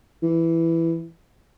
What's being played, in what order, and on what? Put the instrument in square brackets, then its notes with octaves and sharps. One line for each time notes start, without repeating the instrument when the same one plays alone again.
[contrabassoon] E3